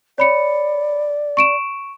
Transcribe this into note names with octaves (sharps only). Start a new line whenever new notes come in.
C#5 D5 B5 C#7
C#6 D7 E7